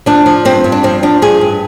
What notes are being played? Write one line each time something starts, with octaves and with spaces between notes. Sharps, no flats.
F3 D4
F3
G2 C4
G2
D4
F3 C4
F3 D4
G2 G#4
G2